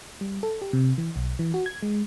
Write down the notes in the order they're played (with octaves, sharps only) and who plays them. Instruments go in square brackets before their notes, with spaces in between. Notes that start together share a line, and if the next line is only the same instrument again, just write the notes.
[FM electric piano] G3
A4
G4
C3
E3
B1
E3
F#4
G#6
G#3